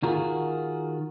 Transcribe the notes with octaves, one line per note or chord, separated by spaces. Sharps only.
D#3 F4 F#4 G#4 A#4